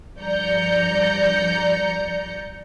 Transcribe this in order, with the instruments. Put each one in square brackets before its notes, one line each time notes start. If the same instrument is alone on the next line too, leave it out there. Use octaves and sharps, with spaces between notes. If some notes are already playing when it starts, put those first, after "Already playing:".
[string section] G2 F3 D5 A#5 G6 C#7